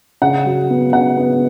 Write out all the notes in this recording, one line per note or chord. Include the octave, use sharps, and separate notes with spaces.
C#3 F#5
F#3
B3
C#3 F#5
B3